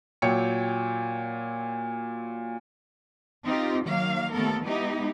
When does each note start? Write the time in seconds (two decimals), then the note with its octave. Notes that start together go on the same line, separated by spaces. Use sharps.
0.22 A#2 F#3 C#5 G5 C#7
3.44 C4 D#4 F4 G4
3.85 D#3 F#3 A#3 F5
4.32 D#2 A3 B3 A4 A#4
4.64 G#3 B3 D#4 E4 G4